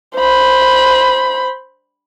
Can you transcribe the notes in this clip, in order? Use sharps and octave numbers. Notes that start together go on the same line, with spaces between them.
C5 B5